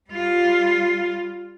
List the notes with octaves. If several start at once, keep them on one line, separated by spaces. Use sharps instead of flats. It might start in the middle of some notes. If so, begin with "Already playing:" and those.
G3 F4